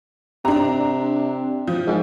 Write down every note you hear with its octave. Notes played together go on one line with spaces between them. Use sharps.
C3 D4 A#5
F3
G#2